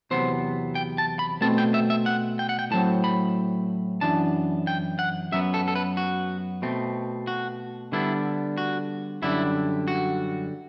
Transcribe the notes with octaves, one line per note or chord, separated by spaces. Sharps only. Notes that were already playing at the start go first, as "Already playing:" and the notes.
E2 C3 F#3 B3 C5
G5
A5
B5
B2 A3 C4 A5
G5
E5
E5
F#5
G5
F#5
G5
A2 F#3 C4 A5
B5
F#2 E3 B3 D4 A5
G5
F#5
F#2 F#3 B3 E5
A4
A4
B4
F#4
B2 A3 C4
F#4
D3 G3 B3 D4 E4
F#4
F#2 D3 G3 B3 D4 E4
F#4